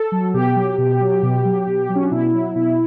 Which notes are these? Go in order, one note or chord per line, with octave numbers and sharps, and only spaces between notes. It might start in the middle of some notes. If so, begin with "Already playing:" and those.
Already playing: A4
F#3
B2 G4
F#3
B2
F#3
B2
F#3
B2
F#3
C#4
D4
B2 E4
F#3
B2 E4